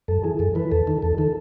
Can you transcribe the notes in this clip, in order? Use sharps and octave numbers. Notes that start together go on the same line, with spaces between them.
F#2 A4
E3 G#4
F#2 A4
E3 B4
E2 A4
D#3
E2 A4
D#3 A4